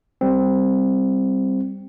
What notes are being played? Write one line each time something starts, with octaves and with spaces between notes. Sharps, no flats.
G3 C4